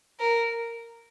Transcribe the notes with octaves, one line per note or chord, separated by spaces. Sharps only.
A#4